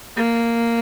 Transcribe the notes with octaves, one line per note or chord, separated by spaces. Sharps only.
A#3